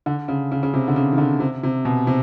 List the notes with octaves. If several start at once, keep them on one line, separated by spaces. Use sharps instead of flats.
D3
C#3
C#3
C#3
C3
D3
C#3
D#3
D3
C3
C3
B2
C3